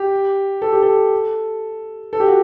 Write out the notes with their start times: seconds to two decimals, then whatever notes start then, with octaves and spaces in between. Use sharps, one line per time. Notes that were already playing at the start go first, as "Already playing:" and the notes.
Already playing: G4
0.62 A4
0.72 G4
0.82 A4
2.13 A4
2.20 G4
2.28 F#4